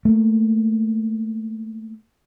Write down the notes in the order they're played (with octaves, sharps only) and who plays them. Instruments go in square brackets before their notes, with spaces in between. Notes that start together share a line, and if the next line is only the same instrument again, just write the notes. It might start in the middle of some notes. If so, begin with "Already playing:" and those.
[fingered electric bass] A3 A#3